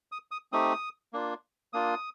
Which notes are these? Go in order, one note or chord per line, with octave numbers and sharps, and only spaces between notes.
D#6
D#6
A3 C4 D#4 G4 D#6
A#3 D4 F4
A#3 D4 F4 D#6